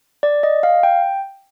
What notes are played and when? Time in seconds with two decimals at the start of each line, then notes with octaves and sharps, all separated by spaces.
0.23 D5
0.43 D#5
0.63 F5
0.83 G5